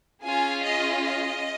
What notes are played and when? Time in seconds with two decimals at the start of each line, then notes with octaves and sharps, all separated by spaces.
0.22 C#4 F4 G#4 G#5
0.63 D#5
1.05 D#5